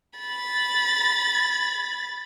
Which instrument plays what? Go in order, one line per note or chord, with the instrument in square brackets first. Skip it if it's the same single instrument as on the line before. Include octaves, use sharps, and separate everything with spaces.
[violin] B5 A6